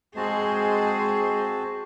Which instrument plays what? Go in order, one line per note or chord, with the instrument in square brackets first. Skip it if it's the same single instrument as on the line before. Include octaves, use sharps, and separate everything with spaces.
[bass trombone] G#3 [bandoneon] C4 F#4 A5 [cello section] G#4 C5